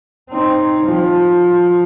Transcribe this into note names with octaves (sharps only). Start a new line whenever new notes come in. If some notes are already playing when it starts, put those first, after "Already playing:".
C4 D#4
F3